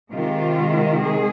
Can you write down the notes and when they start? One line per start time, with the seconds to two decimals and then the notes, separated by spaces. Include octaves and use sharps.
0.12 C3 D#3 G#3 F4
1.01 G#4